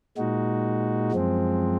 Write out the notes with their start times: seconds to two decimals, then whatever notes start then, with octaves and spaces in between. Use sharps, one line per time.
0.18 A#2 G#3 D#4 F#4
1.12 F#2 F3 G#3 C4